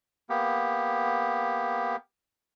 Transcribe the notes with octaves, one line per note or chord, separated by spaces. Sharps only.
A#3 B3 G4